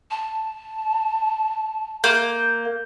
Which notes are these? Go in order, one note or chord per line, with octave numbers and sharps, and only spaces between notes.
A5
A#3 G6